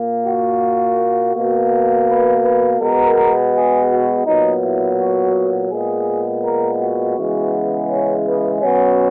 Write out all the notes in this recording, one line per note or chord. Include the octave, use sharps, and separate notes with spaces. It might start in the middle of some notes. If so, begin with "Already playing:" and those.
Already playing: A#2 A#3
F#4
B2 A#3
B4
B4
B2 G#3 B3 A#4
G#4
F#4
A#2 F#3 B3 D#4
E4
F#4
A#2 G#3 B3 G#4
A#4
F#4
C#3 E3 G#3 B3
C#4
B3
B2 F#3 B3 C#4